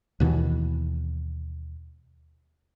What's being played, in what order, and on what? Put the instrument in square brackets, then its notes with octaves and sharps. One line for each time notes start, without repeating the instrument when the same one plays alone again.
[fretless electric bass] D#2 B2 E3